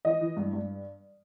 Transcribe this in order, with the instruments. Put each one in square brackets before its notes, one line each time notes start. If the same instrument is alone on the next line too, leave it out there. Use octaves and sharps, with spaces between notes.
[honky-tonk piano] E3 D#5
E3
G2
G2